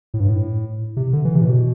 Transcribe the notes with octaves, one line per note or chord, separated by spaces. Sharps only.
A2
G2
A2
C3
D3
E3
C3
A2
B2